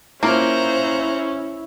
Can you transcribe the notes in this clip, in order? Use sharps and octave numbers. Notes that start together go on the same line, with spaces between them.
A#3 C#4 E4 F4 A#4 C5 A#5 F#6